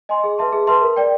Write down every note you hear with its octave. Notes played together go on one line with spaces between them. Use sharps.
D#5 G#5 C6
G#4
B4 E5 A5 C6
G#4
B4 E5 A5 C6
A#4
D5 G5